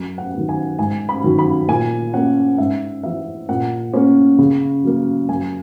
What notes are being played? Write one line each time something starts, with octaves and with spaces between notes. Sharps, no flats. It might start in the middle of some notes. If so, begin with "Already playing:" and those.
Already playing: F#2
F#5
D#3 F#3 B3
G#5
G#2 G#5
B5
D#3 F#3
B5
A#2 G#5
A#3 C#4 F#5
G#2 E5
E3 B3 E5
A#2 F#5
A#3 C#4
C#3
F#3 A#3
F#2 G#5